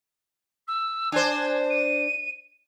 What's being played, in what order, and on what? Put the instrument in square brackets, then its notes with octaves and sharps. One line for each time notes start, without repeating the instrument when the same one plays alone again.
[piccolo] E6
[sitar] D4 C5 [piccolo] G#5
[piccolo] D#7